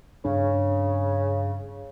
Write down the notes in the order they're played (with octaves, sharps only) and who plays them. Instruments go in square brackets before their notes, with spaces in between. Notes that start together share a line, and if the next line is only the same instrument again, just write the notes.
[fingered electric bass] G2 D4 [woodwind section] C#3